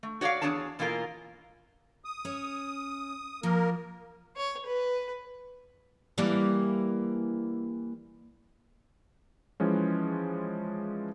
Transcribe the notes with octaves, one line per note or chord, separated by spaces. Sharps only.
A3
F#4 C#5 D5 E5 F5
E2 G3 D4 G#4 C#5 A5
B2 E3 A#3 F4 A#4
D#6
C#4 C#5
F3 A#3 A#4
C#5
B4
E3 G3 A#3
E3 F3 G#3 C#4